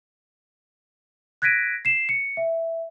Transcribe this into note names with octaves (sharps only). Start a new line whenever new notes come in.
F#6 G#6 A#6 B6 D7 D#7
C7 E7
C#7
E5